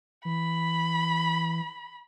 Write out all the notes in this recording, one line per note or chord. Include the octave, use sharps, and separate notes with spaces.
E3 B5